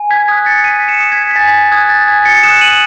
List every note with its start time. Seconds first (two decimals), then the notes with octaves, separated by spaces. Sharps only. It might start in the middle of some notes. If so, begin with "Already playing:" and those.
Already playing: G#5
0.11 G#6 B6
0.28 D#6 F#6 G#6 B6
0.46 A6 C#7
0.64 G#5 B6 D#7
0.88 C#7 E7
1.00 D#6 F#6
1.12 G#6 B6
1.31 B6
1.36 G#5 A6
1.54 A6
1.72 D#6 F#6 G#6
1.90 A6
2.07 G#5 G#6 B6
2.25 A6 C#7
2.43 D#6 F#6 C#7 E7
2.61 D#7 F#7